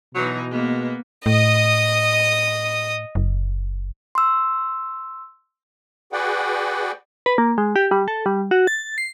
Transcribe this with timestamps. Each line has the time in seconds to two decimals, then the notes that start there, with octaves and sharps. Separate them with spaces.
0.15 B2 E3 F#3 D#4
0.51 G#3 A#3 B3
1.26 A2 D#5 D#6
3.15 F#1
4.15 C6 E6
6.12 F#4 G#4 B4 D5 F#5 G5
7.26 B4
7.38 A#3
7.58 G#3
7.76 G4
7.91 G3
8.08 A4
8.26 G3
8.51 F#4
8.67 A6
8.98 C7